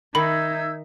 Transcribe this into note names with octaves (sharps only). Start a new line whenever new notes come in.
D#3 D#4 E5 B5 E6 G6 G#6